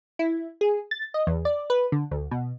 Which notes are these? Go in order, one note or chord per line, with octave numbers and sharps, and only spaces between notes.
E4
G#4
A6
D#5
E2
D5
B4
D3
D2
B2